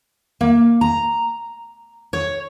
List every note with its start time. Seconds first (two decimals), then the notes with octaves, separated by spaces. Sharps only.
0.41 A#3
0.81 A#5
2.13 C#5